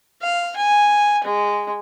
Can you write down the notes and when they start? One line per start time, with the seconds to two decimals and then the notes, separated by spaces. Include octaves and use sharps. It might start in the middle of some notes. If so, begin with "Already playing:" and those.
0.22 F5
0.57 G#5
1.24 G#3